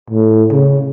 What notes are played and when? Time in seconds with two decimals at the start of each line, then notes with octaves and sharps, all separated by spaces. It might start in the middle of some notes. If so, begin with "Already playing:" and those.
0.10 A2
0.51 C#3